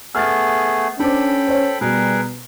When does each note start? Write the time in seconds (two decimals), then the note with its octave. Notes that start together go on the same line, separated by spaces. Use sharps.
0.15 A3 B3 G#4 F6 A6
1.00 C#4 D4 A4 C5 G5 B5 D6
1.47 C5 C#5
1.81 B2 G3 G#4 A#4 B4